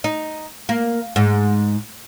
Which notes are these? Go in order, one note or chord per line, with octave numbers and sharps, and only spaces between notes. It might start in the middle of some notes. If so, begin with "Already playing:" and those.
D#4
A#3
G#2